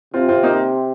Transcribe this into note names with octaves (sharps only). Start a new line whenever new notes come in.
C3 C4 F4
C4 F4
A#3 D#4